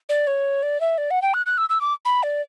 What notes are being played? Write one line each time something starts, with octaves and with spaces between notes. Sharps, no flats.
D5
C#5
D5
E5
D5
F#5
G5
F#6
F#6
E6
E6
D6
B5
D5